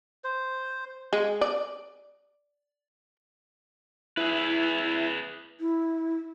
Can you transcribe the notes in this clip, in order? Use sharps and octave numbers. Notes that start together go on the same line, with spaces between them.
C5
G#3
D5
E4 G#4 B4
E4